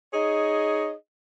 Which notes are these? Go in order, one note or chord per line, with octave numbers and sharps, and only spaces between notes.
D#4 G#4 C#5 D#5